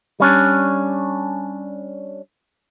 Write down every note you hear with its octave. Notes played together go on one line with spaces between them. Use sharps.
G3 C#4 D4